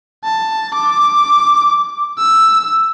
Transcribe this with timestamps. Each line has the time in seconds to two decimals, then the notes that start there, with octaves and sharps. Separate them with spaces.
0.24 A5
0.74 D6
2.19 E6